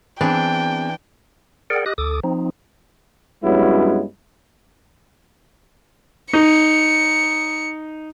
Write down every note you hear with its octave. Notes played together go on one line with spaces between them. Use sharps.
E3 B3 C4 D4 G#4 G5
G#4 A#4 D5 F#5 G5
G4 D#5 D#6 F#6
D2 A4 D6 D#6
F3 C4 D#4
G2 F#3 G#3 B3 C#4 E4
D#4 C#7